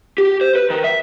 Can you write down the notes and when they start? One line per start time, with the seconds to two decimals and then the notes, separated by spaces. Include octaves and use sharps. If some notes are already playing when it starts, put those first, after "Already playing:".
0.18 G4
0.41 C5
0.56 B4
0.70 D#3
0.84 E5